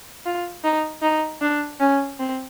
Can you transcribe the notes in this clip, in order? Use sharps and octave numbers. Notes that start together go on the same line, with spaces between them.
F4
D#4
D#4
D4
C#4
C4